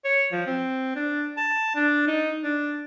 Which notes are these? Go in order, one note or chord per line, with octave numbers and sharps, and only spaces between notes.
C#5
F3
C4
D4
A5
D4
D#4
D4